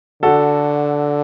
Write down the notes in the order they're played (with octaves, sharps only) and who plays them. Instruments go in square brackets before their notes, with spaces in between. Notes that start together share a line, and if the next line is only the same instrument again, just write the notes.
[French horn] D3 [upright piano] F#4 A4